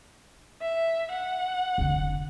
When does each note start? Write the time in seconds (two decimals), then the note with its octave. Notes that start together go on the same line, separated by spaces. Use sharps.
0.62 E5
1.11 F#5
1.78 F1 D3